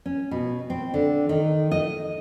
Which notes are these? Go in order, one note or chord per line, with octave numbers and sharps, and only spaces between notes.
C#4
B2
C4
D3
D#3
D#5